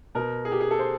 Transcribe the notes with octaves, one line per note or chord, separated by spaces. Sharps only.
B2 A#4
G#4
G4
G#4
A4
C5